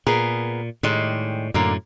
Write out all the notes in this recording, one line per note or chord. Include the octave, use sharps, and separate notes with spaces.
A#2 B3 G#4 A#4
A2 D#3 G3 G#3
F#2 A2 D3 A#3